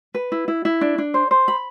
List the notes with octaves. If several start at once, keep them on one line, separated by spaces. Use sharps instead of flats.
B4
E4
E4
E4
D4
D4
C5
C5
B5